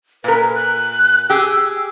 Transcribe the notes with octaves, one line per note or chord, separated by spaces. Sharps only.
A#2 A#4 B4
F#6
G4 G#4 E6